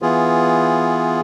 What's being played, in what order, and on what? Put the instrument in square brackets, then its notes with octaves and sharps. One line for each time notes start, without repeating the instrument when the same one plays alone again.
[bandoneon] E3 B3 F4 G#4